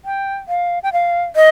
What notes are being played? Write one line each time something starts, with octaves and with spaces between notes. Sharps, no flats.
G5
F5
G5
F5
D#5